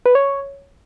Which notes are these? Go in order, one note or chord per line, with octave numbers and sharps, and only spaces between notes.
B4
C#5